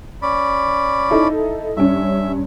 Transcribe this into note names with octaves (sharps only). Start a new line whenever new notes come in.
C#4 D5 B5
D#4 E4 A4
G2 C#4 E5